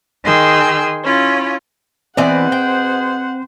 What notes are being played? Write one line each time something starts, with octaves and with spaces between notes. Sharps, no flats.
D#3 G#4 G5 C6 E6
C#4 E4 F4
B2 E3 B3 C4 G#4 C5 D5 F#5
G5